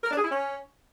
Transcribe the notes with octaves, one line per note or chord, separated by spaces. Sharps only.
A#4
D4
G#4
E4
C#4